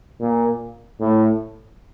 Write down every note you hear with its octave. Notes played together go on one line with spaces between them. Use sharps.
A#2
A2